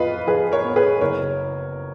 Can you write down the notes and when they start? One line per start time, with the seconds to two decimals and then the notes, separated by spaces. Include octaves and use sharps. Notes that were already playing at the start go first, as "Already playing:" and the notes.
Already playing: F2 F4 B4 D#5 F5
0.27 F3 G#4 B4
0.52 A#4 C#5
0.64 B3
0.76 G#4 B4
1.01 F#1 A#4 C#5